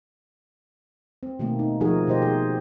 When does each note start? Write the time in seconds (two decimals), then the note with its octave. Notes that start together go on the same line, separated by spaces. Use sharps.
1.23 C4
1.39 B2 D#3 A3 A#3
1.59 D#4
1.81 D#3 F3 D#4 F#4 G#4 A#4
2.07 B2 D#3 G4 C5 D#5
2.22 G#4